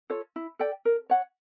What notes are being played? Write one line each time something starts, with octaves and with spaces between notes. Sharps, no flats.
F4 A4 C#5
E4
A4 D5 G5
A#4
C#5 F#5